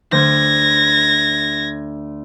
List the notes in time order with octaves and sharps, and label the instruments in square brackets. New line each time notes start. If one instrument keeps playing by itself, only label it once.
[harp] D2 C5 G6 [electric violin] G#6 A#6